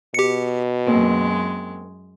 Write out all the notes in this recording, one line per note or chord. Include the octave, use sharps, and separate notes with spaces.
B2 G4 C#7
F#2 G#3 A#3 C4